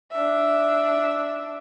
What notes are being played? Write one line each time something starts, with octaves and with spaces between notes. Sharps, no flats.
D4 E5